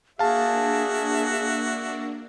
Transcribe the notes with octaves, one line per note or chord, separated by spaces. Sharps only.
A#3 D4 F#4 G#4 E5 F5 A5